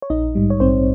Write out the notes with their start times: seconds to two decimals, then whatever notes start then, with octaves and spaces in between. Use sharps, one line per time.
0.02 C#5
0.10 A#1 D#4 D#5
0.35 G#2 G3
0.50 C#5
0.60 A#1 C4 C5